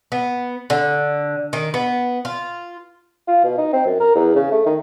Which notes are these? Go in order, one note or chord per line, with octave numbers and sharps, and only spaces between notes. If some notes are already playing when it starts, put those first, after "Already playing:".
B3
D3
D#3
B3
F4
F4
B2
D#4
C4
F#2
A#4
E2
C#3
A3
D#3